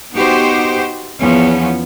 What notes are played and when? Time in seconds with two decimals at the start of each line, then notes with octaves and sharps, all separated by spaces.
0.13 B3 D#4 F#4 G4 C5
1.19 E2 F3 B3 C#4